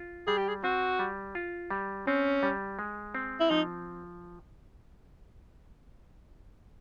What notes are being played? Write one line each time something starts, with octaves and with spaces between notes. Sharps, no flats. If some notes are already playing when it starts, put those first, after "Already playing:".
Already playing: F4
G3 G#4
G4
G#4
C4 F#4
G3
F4
G3
C4 C#4
G3
G#3
C4
E4
F3 D#4